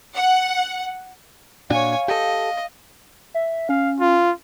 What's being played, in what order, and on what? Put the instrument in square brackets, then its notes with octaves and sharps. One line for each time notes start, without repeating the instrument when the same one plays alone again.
[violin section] F#5
[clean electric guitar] A#2 D4 F#4 [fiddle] C#5 G#5 [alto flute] F5
[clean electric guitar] G4 A4 [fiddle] D#5
[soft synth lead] E5
[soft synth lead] C#4 [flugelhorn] F5
[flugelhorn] F4